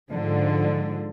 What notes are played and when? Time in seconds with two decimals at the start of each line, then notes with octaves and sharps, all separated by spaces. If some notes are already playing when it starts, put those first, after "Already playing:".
0.12 G#2 D3 F3